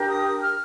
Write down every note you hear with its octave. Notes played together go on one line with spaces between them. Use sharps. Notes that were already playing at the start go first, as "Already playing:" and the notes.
Already playing: D4 G4 A#4
D#6
F6